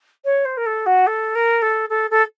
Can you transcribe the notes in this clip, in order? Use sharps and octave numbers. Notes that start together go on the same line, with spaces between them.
C#5
C5
A#4
A4
F#4
A4
A#4
A4
A4
A4